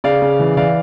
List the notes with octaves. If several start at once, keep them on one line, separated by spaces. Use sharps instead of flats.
C#3 D5 F5
C#3
E3
E3 D5 F5